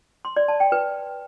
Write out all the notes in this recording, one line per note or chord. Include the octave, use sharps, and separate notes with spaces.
C6
D5
A5
G5
B4